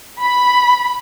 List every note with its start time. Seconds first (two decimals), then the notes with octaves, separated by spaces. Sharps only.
0.22 B5